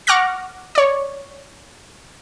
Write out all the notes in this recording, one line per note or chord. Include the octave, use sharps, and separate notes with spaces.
F#5 C#6 D6 F6 F#6 A#6
C#5 D5